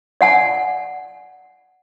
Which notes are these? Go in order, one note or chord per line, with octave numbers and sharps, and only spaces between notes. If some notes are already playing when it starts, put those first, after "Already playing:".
D5 F#5 G#5